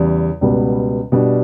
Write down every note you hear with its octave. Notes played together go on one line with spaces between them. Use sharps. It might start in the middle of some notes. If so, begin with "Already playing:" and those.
Already playing: E2 C#3 G3
C#2 B2 G3 B3
B2 G3 D4 G4